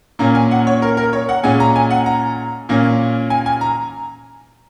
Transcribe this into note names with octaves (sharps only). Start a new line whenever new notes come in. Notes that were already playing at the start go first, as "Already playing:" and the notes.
A#2 A#3 C#4 A#5
G#5
F#5
C#5
A#4
A#4
C#5
F#5
A#2 G#3 C#4 G#5
A#5
G#5
F#5
A#5
A#2 A#3 C#4
G#5
G#5
A#5